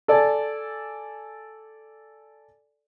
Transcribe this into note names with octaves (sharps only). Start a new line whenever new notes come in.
A4 D5 G#5 A5